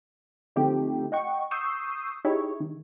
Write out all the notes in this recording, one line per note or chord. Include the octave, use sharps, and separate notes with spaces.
D3 F3 A3 C4 D#4 G4
D#5 F#5 G5 C#6
C#6 D#6 E6 G6 C7
D#4 E4 G4 G#4 C#5
D#3